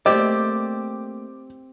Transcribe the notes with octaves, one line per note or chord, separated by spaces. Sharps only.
A3 A#3 C4 G4 D5 D#5 D6